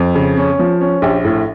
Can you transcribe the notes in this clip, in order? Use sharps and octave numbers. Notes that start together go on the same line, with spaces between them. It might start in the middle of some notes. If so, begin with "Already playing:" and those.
Already playing: F2
C#3
C#4
F3
C#4
A#1 G4
A2